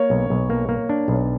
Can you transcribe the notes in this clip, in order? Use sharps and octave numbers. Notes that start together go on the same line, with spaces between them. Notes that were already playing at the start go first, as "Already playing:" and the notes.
Already playing: A#3 C#5
B1
B1
A#3
A#3
D4
B1